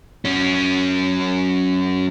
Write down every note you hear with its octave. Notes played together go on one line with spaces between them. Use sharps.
F#3 C#4